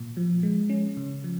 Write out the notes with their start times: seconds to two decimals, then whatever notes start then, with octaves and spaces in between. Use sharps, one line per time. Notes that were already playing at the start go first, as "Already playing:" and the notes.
Already playing: A#2
0.17 F3
0.43 G#3
0.69 C#4
0.97 C#3
1.24 F3